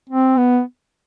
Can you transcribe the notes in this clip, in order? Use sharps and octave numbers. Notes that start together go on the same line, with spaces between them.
C4
B3